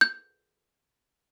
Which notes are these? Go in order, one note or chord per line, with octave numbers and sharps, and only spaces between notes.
G6